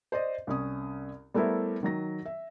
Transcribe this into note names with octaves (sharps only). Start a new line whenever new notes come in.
C5 D5 D#5
C2 C#4 D#6
G3 A3 B3 E4 A#4 C5
D#3 F#3 A#6
E5